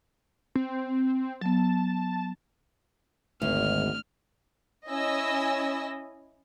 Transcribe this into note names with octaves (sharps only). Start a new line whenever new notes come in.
C4
F#3 B3 A5
G#1 D2 F6
C#4 E4 D#5 G#5 E6 A#6